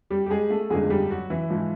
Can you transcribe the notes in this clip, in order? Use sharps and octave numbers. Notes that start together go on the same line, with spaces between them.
G3 G4
G4
G#3 G#4
A3 A4
G1 F2 D3 G#3 G#4
G3 G4
F#3 F#4
E3 E4
G#2 F3